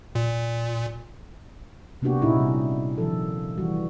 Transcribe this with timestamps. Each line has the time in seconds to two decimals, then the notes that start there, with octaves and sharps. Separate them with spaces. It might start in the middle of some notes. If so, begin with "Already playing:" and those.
0.15 A#2
2.02 C3 A#3 B3 D4 F#4 G4
2.22 A#2 C#4 D#4 E4 G#4
2.36 C3 G3
2.98 D#3 F3 A4
3.58 E3 G3 F#4